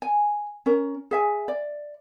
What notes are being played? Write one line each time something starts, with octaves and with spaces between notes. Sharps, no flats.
G#5
C#4 A#4
G#4 E5 G#5
D5